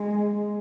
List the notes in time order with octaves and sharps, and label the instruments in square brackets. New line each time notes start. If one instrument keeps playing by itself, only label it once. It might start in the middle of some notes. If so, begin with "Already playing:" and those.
Already playing: [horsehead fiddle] G#3